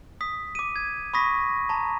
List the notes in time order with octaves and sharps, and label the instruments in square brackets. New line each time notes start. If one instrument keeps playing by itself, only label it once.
[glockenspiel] D#6 B6
D6 D#7
G#6
B5 C#6 D#6 A#6 B6
A5 A#5